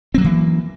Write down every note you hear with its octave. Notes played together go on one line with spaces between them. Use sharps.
E3 F#3 A#3 C4